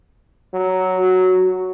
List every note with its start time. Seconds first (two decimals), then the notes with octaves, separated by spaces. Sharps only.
0.54 F#3
0.98 F#4